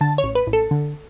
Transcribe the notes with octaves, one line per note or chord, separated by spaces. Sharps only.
D3 A5
C#5
A1
B4
A1
A4
D3